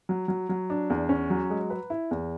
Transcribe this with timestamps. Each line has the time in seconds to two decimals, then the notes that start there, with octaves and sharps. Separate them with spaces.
0.09 F#3
0.28 F#3
0.49 F#3
0.70 D4
0.90 E2
1.09 C#4
1.30 F#3
1.50 G#3
1.70 B4
1.90 E4
2.11 E2